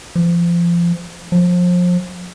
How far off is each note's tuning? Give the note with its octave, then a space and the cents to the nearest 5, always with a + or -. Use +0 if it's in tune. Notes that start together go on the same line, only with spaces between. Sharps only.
F3 -25
F3 +30